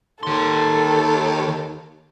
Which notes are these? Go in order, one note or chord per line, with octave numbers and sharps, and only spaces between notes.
D#2 D#3 A4 C6